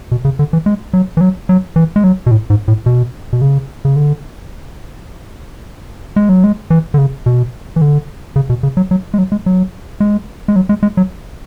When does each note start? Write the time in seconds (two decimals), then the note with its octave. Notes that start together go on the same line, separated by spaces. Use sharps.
0.12 B2
0.25 C#3
0.39 D3
0.53 E3
0.66 G#3
0.93 F#3
1.17 E3
1.21 F#3
1.49 F#3
1.76 E3
1.96 G#3
2.04 F#3
2.26 B2
2.31 A2
2.50 G#2
2.68 A2
2.86 B2
3.33 B2
3.42 C#3
3.85 C#3
3.96 D3
6.16 G#3
6.29 F#3
6.44 G#3
6.70 E3
6.94 D3
6.98 C#3
7.26 B2
7.76 E3
7.81 D3
8.36 C#3
8.50 B2
8.63 C#3
8.77 F#3
8.91 F#3
9.14 G#3
9.18 F#3
9.32 G#3
9.46 F#3
10.00 G#3
10.48 G#3
10.56 F#3
10.69 G#3
10.83 G#3
10.97 F#3